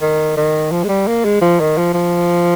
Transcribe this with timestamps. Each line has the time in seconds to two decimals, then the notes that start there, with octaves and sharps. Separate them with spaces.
0.02 D#3
0.37 D#3
0.71 F3
0.84 G#3
0.89 G3
1.07 A#3
1.25 G#3
1.41 F3
1.60 D#3
1.77 F3
1.94 F3